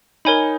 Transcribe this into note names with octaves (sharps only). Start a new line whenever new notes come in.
D#4 A#4 C#5 G#5 B5